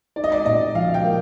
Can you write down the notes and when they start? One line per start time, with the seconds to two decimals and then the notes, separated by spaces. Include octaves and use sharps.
0.16 D#4 D5
0.24 D#5
0.32 D5
0.46 A#2 D#5
0.75 F3 F5
0.89 F5
0.94 G5
1.04 A#3